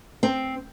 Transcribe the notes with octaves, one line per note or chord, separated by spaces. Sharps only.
C4